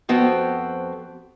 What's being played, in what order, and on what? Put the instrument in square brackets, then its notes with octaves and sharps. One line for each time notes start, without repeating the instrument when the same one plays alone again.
[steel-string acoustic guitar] F2 B3 F#4 A4 C5 G5